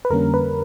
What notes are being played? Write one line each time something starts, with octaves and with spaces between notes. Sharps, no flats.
B4
F2 D3 G3 A#3 C#4 A#4
B4